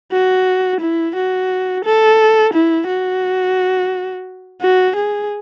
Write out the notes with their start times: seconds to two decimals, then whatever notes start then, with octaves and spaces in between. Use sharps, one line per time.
0.11 F#4
0.80 E4
1.15 F#4
1.84 A4
2.53 E4
2.88 F#4
4.61 F#4
4.96 G#4